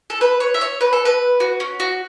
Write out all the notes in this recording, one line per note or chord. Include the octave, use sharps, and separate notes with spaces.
A4
B4
C#5
E5
C#5
B4
A4
B4
F#4
C#4
F#4